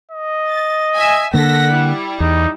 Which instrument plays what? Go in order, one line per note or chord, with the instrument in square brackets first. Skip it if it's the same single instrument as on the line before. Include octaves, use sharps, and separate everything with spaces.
[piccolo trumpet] D#5
[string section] A6
E5 G#5
[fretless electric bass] D3 A#3 [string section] A4 A#6 B6 [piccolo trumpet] F#5
[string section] G3 E4
[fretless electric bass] E2 [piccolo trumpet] D#4